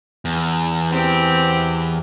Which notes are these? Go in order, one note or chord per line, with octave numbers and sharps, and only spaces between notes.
E2
C4 G4